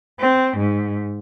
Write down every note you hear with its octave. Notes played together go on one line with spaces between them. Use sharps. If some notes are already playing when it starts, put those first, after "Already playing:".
C4
G#2